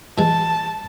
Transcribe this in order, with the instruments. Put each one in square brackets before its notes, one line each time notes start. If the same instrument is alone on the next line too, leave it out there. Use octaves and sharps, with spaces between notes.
[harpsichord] E3 G#3 [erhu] A5